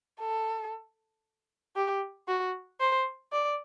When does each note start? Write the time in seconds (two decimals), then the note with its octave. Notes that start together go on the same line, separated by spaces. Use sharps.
0.20 A4
1.76 G4
2.28 F#4
2.80 C5
3.32 D5